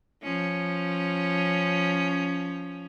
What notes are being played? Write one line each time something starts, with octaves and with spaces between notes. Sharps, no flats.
F3 C#4